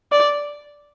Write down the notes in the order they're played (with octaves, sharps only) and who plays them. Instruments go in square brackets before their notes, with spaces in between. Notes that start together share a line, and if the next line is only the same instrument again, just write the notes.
[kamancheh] D5